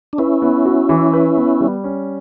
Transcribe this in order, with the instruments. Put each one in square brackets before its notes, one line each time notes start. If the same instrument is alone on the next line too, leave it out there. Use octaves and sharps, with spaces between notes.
[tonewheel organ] D4
[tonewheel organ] C#4 E4 [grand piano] B4
[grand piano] B3
F#4
E3
B4
B3
G3
C#4